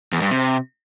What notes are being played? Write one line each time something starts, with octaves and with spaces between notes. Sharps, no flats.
E2
G2
C3